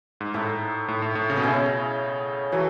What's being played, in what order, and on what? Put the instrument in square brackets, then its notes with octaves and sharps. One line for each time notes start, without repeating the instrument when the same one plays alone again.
[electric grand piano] G#2
[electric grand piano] A2 [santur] D#4 A4 E5
[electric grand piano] A2
A2
A2
C#3
B2
[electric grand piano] C#3 [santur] C#4 E4 G#4 D#5
[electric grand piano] E3 [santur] F#3 A3